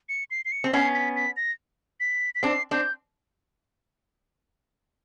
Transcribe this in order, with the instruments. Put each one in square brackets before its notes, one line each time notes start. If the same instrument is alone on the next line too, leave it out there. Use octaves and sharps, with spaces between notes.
[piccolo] C#7
C7
C7
C#7
[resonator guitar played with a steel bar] C4
[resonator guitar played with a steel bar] B3 C#4 [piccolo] C7
[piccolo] B6
B6
A#6
B6
B6
[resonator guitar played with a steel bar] C4 D4 [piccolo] C7
[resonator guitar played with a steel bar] C4 D4 [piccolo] G6